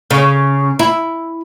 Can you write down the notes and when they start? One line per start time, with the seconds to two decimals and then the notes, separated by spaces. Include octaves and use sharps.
0.11 C#3
0.79 E4